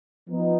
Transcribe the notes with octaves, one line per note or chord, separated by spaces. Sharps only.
F3 B3 D#4